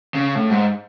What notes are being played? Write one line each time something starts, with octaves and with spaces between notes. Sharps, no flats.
C#3
A2
G#2